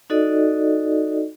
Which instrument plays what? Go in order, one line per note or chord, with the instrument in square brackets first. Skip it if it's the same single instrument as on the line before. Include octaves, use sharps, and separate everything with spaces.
[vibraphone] D#4 F#4 A4 D5 D#5